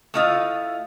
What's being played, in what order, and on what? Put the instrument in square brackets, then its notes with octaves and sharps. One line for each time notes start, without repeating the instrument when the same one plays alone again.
[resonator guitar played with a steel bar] A3 E4 F4 D#5 F5